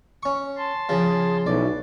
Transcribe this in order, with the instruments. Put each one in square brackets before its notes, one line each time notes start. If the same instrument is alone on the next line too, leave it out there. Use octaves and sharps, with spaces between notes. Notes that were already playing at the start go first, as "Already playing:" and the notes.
[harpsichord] C#4 C#6
[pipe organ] A5 C6
[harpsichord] C#3 F3 [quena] G#4
[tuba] B1 [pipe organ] C#4 E4 F#4 [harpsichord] D5